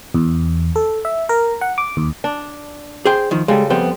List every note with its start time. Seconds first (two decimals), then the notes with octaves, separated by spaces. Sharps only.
0.14 E2
0.76 A4
1.05 E5
1.29 A#4
1.61 F#5
1.78 D6
1.97 D#2
2.24 D4
3.05 G#4 C5 G5
3.31 D#3 F3
3.48 C#3 G3 G#3 A4
3.70 F2 G3 B3 C5